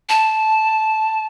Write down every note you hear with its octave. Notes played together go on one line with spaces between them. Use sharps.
A5